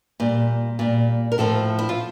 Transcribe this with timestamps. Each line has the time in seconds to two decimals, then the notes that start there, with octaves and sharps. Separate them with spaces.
0.20 A#2 G3
0.79 A#2 G3
1.32 A#4
1.38 A2 F3 A4
1.79 E4
1.89 F4